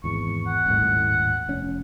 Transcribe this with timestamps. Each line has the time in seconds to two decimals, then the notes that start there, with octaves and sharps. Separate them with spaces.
0.04 G#1 E2 C#6
0.47 F#5
0.66 D#1 G#1 A2
1.48 F1 C#4